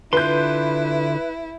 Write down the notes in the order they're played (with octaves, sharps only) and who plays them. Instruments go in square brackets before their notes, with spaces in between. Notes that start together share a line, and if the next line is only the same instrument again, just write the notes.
[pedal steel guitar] D3 F4 C6 [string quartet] E4 [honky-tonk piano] B4 G6